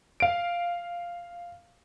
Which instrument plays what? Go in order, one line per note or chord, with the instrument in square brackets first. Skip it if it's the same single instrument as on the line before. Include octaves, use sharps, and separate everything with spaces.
[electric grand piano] F5 D7